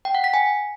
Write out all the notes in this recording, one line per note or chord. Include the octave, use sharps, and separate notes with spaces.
G5
F#5
B6
G#5